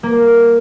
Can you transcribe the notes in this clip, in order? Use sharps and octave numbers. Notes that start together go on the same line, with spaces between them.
A#3